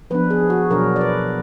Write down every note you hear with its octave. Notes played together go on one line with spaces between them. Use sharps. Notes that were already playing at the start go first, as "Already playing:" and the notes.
F3 B3 D4 B4
G#4
F#4
B2 F#3 D4 A#4
D5
B4